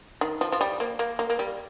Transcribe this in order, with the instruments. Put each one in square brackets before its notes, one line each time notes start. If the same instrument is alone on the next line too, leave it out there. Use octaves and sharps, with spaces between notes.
[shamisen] D#3
F3
F3
G3
A#3
A#3
A#3
A#3
G3